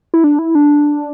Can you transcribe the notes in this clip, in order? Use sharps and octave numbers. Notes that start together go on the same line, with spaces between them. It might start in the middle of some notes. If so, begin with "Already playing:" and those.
E4
D4
E4
D4